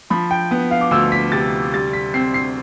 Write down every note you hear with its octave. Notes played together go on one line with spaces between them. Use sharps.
F3 B5
G5
B3
F5
D6
D2 E6
B6
C3 A6
G3 A6
B6
C4 C7
C7